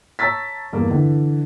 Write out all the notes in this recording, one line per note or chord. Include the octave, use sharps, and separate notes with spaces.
C#5 A5 A#5 E6 A6 B6
E2 G2 A#3
D3 E3